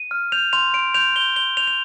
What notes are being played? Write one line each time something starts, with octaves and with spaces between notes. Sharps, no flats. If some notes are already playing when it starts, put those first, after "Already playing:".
Already playing: D#7
F6
G6 F7
C6 F7
C6 D7
G6 F7
G6 G7
C6 G7
G6 F7
F7